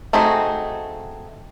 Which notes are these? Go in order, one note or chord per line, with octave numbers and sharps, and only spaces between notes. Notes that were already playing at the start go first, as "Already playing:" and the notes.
A3 C4 D#4 F#4 G#4